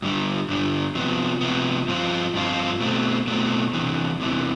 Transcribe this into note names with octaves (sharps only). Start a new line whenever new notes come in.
G2 D3 G3
G2 D3 G3
C3 F3 B3
C3 F3 B3
G2 F3 C4 F4
G2 F3 C4 F4
B2 A3 C4
B2 A3 C4
E2 C3 E3
E2 C3 E3